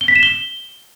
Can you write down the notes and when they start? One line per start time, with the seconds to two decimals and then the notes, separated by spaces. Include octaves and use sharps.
0.01 G7
0.08 B6
0.15 E7
0.23 G7